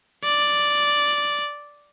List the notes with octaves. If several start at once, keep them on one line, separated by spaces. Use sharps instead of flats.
D5